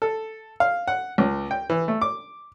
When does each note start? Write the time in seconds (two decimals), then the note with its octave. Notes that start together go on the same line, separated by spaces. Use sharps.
0.02 A4
0.60 F5
0.88 F#5
1.18 C#2
1.51 G5
1.70 E3
1.88 A3
2.02 D6